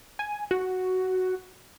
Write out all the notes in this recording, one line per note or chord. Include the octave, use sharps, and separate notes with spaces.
G#5
F#4